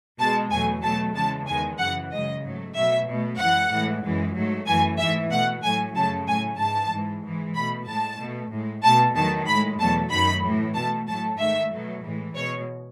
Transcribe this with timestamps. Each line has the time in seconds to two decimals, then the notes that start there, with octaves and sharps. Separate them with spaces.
0.19 B2 G#3 A5
0.51 E2 B2 F#3 A3 G#5
0.83 B2 F#3 A3 A5
1.15 E2 C#3 E3 G#3 A5
1.47 E2 D#3 G#3 G#5
1.79 F#2 C#3 E3 F#5
2.11 F#2 C#3 G#3 D#5
2.43 G#2 F#3 A3
2.75 B2 F#3 A3 E5
3.08 B2 A3
3.39 F#2 E3 G#3 F#5
3.71 A2 E3 G#3
4.04 F#2 E3 G#3
4.36 G#2 F#3 A3
4.67 F#2 E3 A3 G#5
4.99 G#2 E3 A3 E5
5.31 B2 A3 F#5
5.64 A2 F#3 A3 G#5
5.95 F#2 C#3 F#3 A3 A5
6.28 A2 F#3 A3 G#5
6.59 G#2 E3 G#3 A5
6.92 G#2 E3 G#3
7.23 G#2 E3 G#3
7.55 B2 A3 B5
7.88 A2 G#3 A5
8.19 B2 A3
8.51 A2 G#3
8.83 B2 A3 A5
9.16 E2 D#3 F#3 A3 A5
9.47 A2 G#3 B5
9.80 E2 B2 F#3 A3 A5
10.12 F#2 D#3 F#3 A3 B5
10.44 A2 E3 A3
10.75 B2 A3 A5
11.08 A2 F#3 A3 A5
11.39 G#2 D#3 A3 E5
11.72 B2 F#3 A3
12.04 A2 E3 G#3
12.35 B2 G#3 C#5